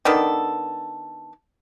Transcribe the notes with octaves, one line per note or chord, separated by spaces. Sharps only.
D#3 B3 D4 A4